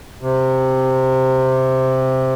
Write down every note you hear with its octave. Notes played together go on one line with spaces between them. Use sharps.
C3